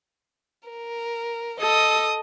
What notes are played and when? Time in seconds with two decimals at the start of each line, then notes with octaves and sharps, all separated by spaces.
0.69 A#4
1.60 A4 D#5 D#6